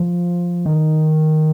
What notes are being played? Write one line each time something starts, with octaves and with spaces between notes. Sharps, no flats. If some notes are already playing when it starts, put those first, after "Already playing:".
Already playing: F3
D#3